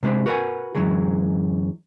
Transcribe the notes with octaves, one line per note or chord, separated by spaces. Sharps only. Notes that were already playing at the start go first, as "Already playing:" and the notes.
C3 G#3 D4 C5 E5
F#4 A#4 B4 C#5 F#5 G#5
F#2 A2 D3 E3 F#3 G#3